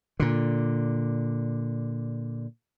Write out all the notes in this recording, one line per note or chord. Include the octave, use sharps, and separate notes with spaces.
A#2 D3